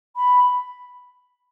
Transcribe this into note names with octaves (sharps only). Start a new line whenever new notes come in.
B5